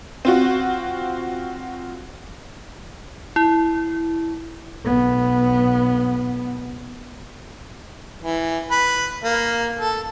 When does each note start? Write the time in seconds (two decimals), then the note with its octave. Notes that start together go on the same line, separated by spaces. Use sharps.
0.25 C4 F4 F#4
3.36 E4
4.84 B1 B3
8.22 E3
8.71 B4
9.24 A#3
9.79 A4